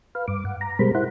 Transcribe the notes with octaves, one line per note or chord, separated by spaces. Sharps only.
B4 F5
G2 D6
F#5
A#5
B2 G3 G#3 A#4 C5 B5
E4 C5 F#5